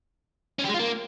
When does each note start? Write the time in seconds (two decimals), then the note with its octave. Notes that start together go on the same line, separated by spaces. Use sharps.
0.59 C#4
0.64 G4
0.69 G#3
0.74 F4
0.79 A#3